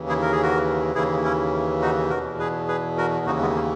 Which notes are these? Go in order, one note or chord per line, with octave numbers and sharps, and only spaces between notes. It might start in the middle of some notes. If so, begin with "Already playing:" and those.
Already playing: D#2 C#3 E3
E4 G#4
A#4
G#4
F#4 A#4
D#2 C#3 E3 E4 G#4
C#4 E4
D#4 F#4
E2 B2 F#4 A#4
G#4 B4
G#4 B4
F#4 A#4
D#2 C#3 E3 D#4 F#4
G#3 B3
A#3